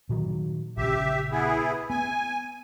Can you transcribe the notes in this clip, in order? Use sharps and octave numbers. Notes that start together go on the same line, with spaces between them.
A#2 D#3 F#3
A#1 C#3 G4 E5
B3 E4 G#4
B3 G#5